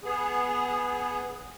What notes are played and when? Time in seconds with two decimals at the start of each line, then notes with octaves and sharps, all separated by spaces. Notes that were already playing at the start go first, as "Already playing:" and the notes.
0.04 B3 G#4